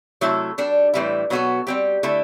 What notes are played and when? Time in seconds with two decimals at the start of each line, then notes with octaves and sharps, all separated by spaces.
0.21 C3 F#3 A3 E4 A4
0.58 G3 D4 A4
0.94 A2 E3 G3 C4 E4
1.30 B2 F#3 B3 F#4 A4
1.67 G3 C4 G4
2.03 D3 A3 E4 A4